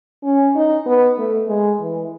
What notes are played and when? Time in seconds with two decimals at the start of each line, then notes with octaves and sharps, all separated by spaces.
0.24 C#4
0.56 D#4
0.86 B3
1.18 A3
1.49 G#3
1.81 E3